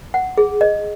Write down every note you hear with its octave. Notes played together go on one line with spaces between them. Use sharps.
F#5
G#4
D#5